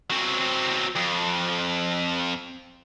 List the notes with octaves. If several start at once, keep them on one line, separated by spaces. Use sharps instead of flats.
F#3 C4
F2